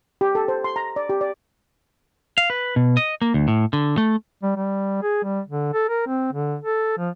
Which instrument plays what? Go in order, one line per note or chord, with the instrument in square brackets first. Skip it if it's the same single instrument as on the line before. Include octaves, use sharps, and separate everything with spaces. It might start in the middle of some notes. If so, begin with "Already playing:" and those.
[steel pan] G4
A4
C5
C6
A#5
D5
G4
D5
[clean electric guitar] F5
B4
B2
D#5
A#3
D2
A2
D3
A3
[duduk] G3
G3
G#4
G3
D3
A4
A#4
C4
D3
A4
F3